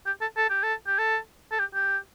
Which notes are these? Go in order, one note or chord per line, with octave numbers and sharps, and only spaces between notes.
G4
A4
A4
G4
A4
G4
A4
A4
G4
G4